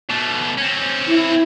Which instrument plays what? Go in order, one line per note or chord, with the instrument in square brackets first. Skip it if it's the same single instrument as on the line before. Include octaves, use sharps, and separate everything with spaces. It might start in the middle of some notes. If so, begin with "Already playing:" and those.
[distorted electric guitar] B2 A3
C4 C#4
[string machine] E4